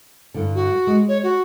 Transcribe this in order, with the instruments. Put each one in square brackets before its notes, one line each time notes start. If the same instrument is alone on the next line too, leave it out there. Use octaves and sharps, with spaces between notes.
[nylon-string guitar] G2 D3
[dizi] F#4
[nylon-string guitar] G#3
[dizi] C#5
F#4